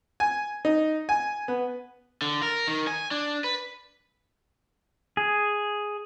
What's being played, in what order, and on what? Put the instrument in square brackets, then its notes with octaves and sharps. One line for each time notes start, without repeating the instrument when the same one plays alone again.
[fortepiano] G#5
D#4
G#5
B3
[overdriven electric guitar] D3
A#4
D#3
G#5
D4
B4
[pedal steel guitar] G#4